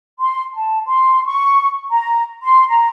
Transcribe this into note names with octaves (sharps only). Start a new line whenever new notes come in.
C6
A5
C6
C#6
A#5
C6
A#5